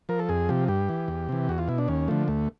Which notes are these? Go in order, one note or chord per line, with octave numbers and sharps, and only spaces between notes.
F3 A#4
A4
F2 G#4
C3 F3 G4
G2 G4
E3
E2
C3 E3
E2 F#4
F4
B2 E4
D4
D#2 C#4
D3 F3 A3
D2 A3